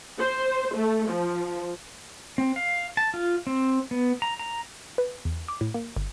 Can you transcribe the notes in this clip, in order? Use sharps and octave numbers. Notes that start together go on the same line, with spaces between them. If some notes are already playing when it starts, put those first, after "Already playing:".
C5
A3
F3
C4
F5
A5
F4
C4
B3
A#5
A#5
B4
E2
D6
A2
A#3
G1